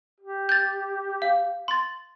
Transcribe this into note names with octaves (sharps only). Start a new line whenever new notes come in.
G4
G6 A6
F5
C6 A6